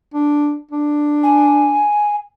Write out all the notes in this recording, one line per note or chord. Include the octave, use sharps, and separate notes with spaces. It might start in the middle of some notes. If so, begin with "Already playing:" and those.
D4
D4
G#5